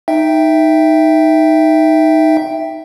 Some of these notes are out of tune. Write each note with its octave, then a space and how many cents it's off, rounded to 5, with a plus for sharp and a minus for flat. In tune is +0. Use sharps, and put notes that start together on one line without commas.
D#4 +0 E5 +0 G5 +0